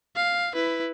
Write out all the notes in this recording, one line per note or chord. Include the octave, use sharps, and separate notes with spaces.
F5
E4 B4